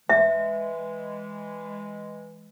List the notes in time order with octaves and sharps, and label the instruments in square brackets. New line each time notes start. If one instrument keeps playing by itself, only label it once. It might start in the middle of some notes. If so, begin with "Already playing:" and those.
[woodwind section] E3 G#3 [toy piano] E5